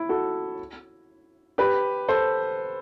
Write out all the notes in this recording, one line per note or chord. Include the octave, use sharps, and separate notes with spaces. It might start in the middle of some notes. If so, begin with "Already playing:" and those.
Already playing: E4
F#4 A4
G4 B4
A4 C5